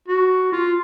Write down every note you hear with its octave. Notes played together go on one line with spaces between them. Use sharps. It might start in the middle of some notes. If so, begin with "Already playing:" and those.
F#4
F4